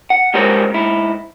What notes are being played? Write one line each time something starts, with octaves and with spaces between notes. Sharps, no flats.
F#5
G3 G#3 F#4 A#4 C5 C#5
G#2 E4